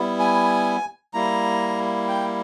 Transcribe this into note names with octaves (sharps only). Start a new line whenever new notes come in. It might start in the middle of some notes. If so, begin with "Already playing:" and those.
Already playing: G3 B3 E4
G#5
G3 A#3 E4 A#5
G5